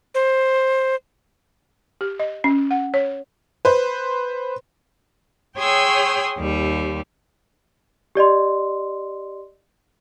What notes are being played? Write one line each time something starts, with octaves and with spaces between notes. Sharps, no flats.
C5
G4
D#5
C#4
F#5
C#5
B4 C5
G#4 C#5 G5 C6 D#6 E6
D#2 G3
G4 D5 D#5 C6